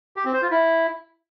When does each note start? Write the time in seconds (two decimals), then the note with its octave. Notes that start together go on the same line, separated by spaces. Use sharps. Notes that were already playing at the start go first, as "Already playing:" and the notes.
0.16 G4
0.25 C4
0.34 C5
0.42 F4
0.51 E4